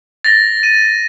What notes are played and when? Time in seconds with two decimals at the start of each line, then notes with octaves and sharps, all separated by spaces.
0.24 A6 A#6
0.63 D#7